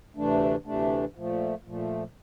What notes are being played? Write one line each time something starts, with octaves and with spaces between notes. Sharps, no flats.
D2 C3 E3 A3 D4
D2 C3 E3 A3 D4
A#2 F3 A3
A#2 F3 A3